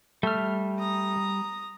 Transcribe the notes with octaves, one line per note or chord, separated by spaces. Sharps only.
G3 A3 F6
A#5 D#6